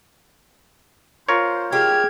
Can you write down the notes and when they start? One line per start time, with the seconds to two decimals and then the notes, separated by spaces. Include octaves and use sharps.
1.29 F4 A#4 C5 C#5
1.73 G#3 G4 F6 G#6